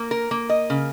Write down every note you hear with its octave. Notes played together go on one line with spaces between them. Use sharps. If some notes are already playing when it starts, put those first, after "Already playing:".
Already playing: A#3
A#4
A#3
D#5
C#3